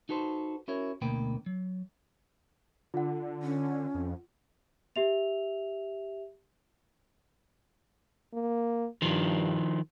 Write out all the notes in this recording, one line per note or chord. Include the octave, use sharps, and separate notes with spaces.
D#4 F#4 A4 B4 C5
C#4 E4 F#4 A#4 C#5
D2 B2 A#3 B4 G5
F#3
D3 F4 F#5
C#4
F2
G4 E5 F7
A#3
G2 D#3 F3